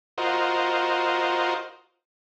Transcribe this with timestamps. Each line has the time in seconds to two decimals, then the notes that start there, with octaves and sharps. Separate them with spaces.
0.18 F4 F#4 A#4 C5 D#5